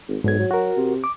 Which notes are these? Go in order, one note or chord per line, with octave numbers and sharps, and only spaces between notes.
G#1
B1 G#2 G#6
F#3
F#4 A#4
C3
D6